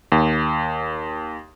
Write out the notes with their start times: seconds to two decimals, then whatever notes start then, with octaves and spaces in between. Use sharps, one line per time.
0.12 D#2